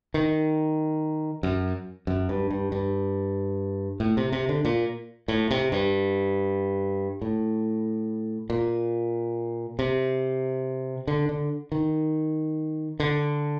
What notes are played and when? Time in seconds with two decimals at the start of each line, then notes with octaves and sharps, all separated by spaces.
0.14 D#3
1.43 F#2
2.07 F#2
2.29 G2
2.51 G2
2.72 G2
4.00 A2
4.17 C3
4.32 C3
4.49 D3
4.65 A#2
5.28 A2
5.51 C3
5.72 G2
7.22 A2
8.50 A#2
9.79 C3
11.07 D3
11.29 D3
11.72 D#3
13.00 D3